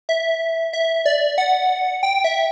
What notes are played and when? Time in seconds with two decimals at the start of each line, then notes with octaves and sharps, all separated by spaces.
0.09 E5
0.73 E5
1.06 D5
1.38 F#5
2.03 G5
2.24 E5